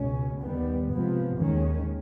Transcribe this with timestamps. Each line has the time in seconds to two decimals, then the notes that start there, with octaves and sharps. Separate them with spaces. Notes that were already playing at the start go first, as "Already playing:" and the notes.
Already playing: C#2 B2 G#3 C#4
0.40 D#2 D#3 G3 B3
0.89 C3 F3 G#3 B3
1.39 D#2 D#3 G#3 C#4